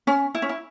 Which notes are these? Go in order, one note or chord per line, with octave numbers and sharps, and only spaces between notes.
C#4
E4
C#4
E4